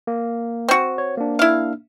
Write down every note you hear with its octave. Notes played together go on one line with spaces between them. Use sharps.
A#3
C4 F#4
C#5
A#3 D4
E4 F5